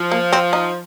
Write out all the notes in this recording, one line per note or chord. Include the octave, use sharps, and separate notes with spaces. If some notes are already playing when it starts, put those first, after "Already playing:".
Already playing: F3
A#3
C4
D#4